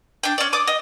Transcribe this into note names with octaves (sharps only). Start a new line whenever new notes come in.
D4 G5
C#4 D5
D5 D6 D#6
D#5